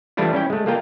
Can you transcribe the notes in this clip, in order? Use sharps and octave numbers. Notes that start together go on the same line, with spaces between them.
E3 G3 A3 D4 E4 F4
C#4 E4 G5
G#3 A3
A3 A#3 F4 G5 A#5